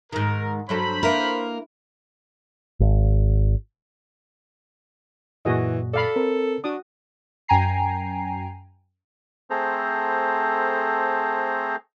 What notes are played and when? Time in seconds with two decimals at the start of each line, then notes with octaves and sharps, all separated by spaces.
0.12 G#2 D#3 A#4
0.69 G2 F#3 A4 C5 B5
1.03 A#3 E4 A#4 B4
2.80 G#1
5.45 F#2 A#2 E3 F#4 G#4 D#5
5.93 A4 D5 F5 B5
6.16 C4 A#4
6.64 D4 F#4 D#6
7.48 F#2 G5 G#5 A#5 C7
9.50 A3 C4 G#4 A4 C5 A#5